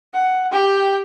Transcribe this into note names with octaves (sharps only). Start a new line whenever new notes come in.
F#5
G4 G5